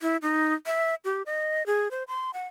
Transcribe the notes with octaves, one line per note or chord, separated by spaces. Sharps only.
E4
D#4
E5
G4
D#5
G#4
C5
C6
F#5